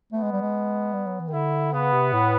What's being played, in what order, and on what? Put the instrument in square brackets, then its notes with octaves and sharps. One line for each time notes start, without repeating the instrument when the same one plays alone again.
[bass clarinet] A3 [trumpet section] B3
[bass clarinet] G#3
G3
G#3
G3
F#3
E3
D#3
[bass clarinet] D3 [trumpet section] E4
[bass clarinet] C#3 [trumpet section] B3
[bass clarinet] C3
A2